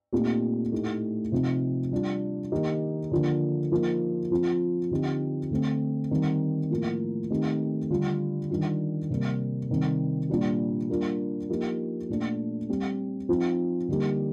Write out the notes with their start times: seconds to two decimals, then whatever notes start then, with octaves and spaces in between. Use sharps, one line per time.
0.12 A#2 A3 C4 D#4 G4
0.72 A2 A3 D#4 G4
1.32 C3 F3 C4 D#4
1.92 G3 D4 F4
2.52 D#3 A#3 D#4 G4
3.11 D3 F3 A#3 D4
3.71 F3 A#3 D#4
4.31 F3 C4 F4
4.91 D3 F3 C4 D#4 G4
5.51 D3 A3 C4
6.11 D#3 G3 C4
6.71 A2 F3 A#3
7.30 D#3 A3 C4 D#4 G4
7.90 D3 G3 D4 F4
8.50 D#3 G3 D4 F4
9.10 C3 G3 A#3
9.70 C3 D#3 G3 C4
10.30 A#2 G3 D4 G4
10.89 G3 A#3 D4 F4
11.49 F3 A#3 D#4 G4
12.09 A#2 A3 D4
12.69 G3 C4 G4
13.29 F3 C4 D#4
13.88 D3 G3 A#3 D#4 G4